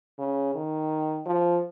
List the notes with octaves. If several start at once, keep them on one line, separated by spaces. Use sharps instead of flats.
C#3
D#3
F3